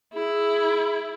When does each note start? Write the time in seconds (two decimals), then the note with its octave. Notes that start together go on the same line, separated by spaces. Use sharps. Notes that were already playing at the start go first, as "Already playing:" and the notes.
0.14 E4 G#4